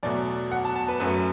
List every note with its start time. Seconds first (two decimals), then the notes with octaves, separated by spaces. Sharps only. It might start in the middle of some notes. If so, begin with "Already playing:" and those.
0.03 E2 B2 F#3 A3 D5
0.52 F#5
0.65 A5
0.76 A5
0.88 B4
1.00 F#2 F#3 A3 B4